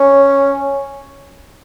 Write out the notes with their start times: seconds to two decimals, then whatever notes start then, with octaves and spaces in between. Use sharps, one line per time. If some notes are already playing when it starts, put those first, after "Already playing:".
Already playing: C#4